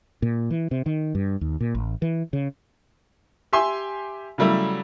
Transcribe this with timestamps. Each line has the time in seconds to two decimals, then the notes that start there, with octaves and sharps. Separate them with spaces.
0.22 A#2
0.51 E3
0.71 C3
0.86 D#3
1.15 G2
1.41 D#2
1.61 A#2
1.75 A1
2.02 E3
2.33 C#3
3.53 G4 E5 G#5 C6
4.38 C#3 F#3 G3 A3 E4